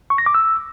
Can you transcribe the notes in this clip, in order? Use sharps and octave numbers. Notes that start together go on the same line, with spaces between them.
C#6
A#6
D6
E6